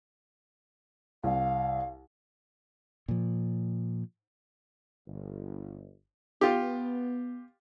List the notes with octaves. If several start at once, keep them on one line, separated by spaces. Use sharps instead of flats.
C2 F5
A#2 F3
G1
B3 F4 G4